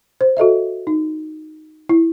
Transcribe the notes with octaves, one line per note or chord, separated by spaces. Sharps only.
C5
F#4 A4 D#5 E5
D#4
E4